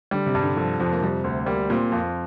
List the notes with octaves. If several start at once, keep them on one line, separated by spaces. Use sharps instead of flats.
D3 G3
C3
G2
D3
D3 F3
F2 F3
A#3
C3 G3
D2
G3 A#3
A#2 C4
F2 F4